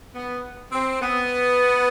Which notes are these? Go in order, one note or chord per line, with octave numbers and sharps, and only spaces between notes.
B3
C4
B3